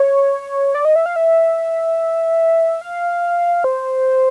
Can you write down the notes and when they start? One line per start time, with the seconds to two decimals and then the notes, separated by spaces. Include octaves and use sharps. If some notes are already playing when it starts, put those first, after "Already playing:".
Already playing: C#5
0.75 D5
0.85 D#5
0.96 E5
1.06 F5
1.16 E5
2.81 F5
3.64 C5